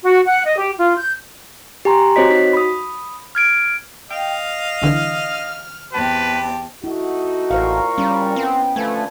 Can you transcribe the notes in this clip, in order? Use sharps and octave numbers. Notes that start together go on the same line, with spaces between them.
F#4
F#5
D#5
G4
F4
G6
G4 G#5 A#5 C6
C4 F#4 C5 C#5 D#5 B6
D#4 F#4 B6
B5 D#6
F6 G#6 D7
D#5 F5 G5
C2 D3 E3 F6
E2 C4 G4 B4 A5
A3 D#4 E4 F#4
A1 A#2 A#4 C5 F5 C#6
G3 C#4
B3 C4 G5
D3 F3 A3 B4 G#5